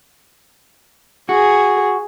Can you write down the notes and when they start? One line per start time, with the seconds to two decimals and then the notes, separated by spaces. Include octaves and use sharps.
1.29 F#4 G#4